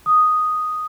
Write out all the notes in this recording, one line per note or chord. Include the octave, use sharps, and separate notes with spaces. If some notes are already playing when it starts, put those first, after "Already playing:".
D#6